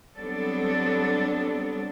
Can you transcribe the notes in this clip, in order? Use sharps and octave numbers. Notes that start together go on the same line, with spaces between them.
F#3 G3 B3 C4 D4 A4